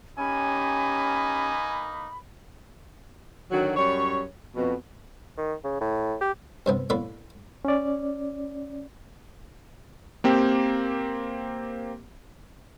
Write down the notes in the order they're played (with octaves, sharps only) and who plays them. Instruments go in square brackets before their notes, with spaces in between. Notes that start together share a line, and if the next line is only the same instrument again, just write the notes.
[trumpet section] A#3 B3 D#4 [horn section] C#4 G4 [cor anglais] G#5 [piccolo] B5
[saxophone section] D3 D#3 F#3
F#2 G3 C#5
F2 B2
[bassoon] D#3
C#3
A2
G4
[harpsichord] G2 C3 B3
A2 A#3 B3 B4 D5
[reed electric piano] C#4 D5
[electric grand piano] A#3 C4 G4